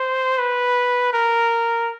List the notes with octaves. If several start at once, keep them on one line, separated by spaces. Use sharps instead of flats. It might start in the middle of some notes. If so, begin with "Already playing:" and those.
Already playing: C5
B4
A#4